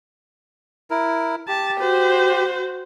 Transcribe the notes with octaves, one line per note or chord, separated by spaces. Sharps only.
E4 A#4
G4 A5
F#4 C5